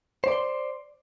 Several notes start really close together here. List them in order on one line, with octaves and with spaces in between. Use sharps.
C5 D5 C6